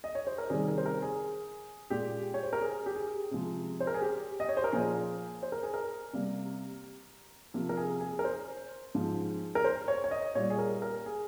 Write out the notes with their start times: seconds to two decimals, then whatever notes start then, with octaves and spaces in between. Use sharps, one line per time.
0.04 D#5
0.15 C#5
0.27 C5
0.38 A#4
0.50 C3 D#3 G3 G#4
0.68 A#4
0.78 C5
0.86 A#4
1.02 G#4
1.90 A#2 G#3 G4
2.34 C#5
2.43 C5
2.53 A#4
2.61 G#4
2.86 G4
2.96 G#4
3.31 C3 F3 G#3
3.80 C5
3.87 A#4
3.94 G#4
4.02 G4
4.40 D#5
4.49 C#5
4.57 C5
4.64 A#4
4.73 A#2 F3 A#3 G#4
5.43 C5
5.52 A#4
5.63 G#4
5.74 A#4
6.13 C3 G3 A#3
7.54 C3 F3 A#3
7.69 A#4
7.77 G#4
8.01 G#4
8.19 A#4
8.24 C5
8.95 G#2 F3 G#3
9.55 A#4
9.64 C5
9.88 C#5
10.04 C#5
10.11 D#5
10.35 A#2 G3 A#3 C#5
10.50 G#4
10.58 A#4
10.82 A#4
11.06 G#4